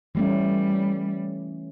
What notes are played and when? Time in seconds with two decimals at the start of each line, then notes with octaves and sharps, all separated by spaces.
0.15 E3 G3 A3 C#4